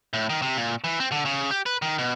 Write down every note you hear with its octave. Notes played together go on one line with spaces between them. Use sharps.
A2
D#3
C3
A#2
E3
C4
D3
C#3
G4
B4
D#3
B2